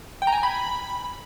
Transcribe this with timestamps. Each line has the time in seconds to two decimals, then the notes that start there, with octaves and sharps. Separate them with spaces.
0.22 G5
0.27 A#5
0.32 G#5
0.38 A#5
0.43 B5